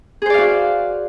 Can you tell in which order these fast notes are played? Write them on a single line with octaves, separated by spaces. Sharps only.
G#4 C5 D5 F5 F#4